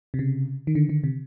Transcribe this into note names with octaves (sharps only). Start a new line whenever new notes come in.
C3
C#3
D#3
D3
D3
C3